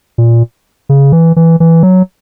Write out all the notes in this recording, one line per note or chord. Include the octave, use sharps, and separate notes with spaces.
A#2
C#3
E3
E3
E3
F#3